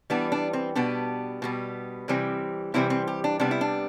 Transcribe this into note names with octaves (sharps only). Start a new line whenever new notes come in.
E3 G3 B3 D4
D4
C4
B2 G3 B3 D4
B2 G3 B3
C3 E3 G3 C4
C3 E3 G3 C4 E4
C4
G4
D4
C3 G3 B3 D4
E4
D4